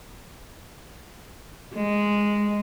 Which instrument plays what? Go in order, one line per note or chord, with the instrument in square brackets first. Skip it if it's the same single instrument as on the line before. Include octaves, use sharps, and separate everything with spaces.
[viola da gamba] G#3